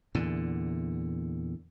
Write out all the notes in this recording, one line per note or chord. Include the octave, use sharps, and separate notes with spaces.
E2 A#2 D3